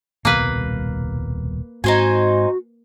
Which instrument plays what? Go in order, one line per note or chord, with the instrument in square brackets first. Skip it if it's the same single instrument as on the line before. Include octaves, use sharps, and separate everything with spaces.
[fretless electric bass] D#1 C2 B2 [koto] A#3 B4
[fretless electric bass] G#2 C4 [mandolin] D#4 C5 G#5 [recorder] F#4